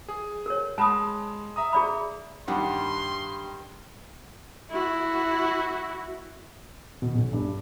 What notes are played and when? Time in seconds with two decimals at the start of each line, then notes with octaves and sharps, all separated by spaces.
0.09 G#4
0.46 A#4 C#5
0.78 G#3 A5 B5 D#6 E7
1.56 E5 A#5 D#6
1.73 G#4 D5 B5
2.48 G2 D#3 G3 D4 F#5 C6
4.70 E4 F#4
7.02 B2
7.15 B1
7.33 G2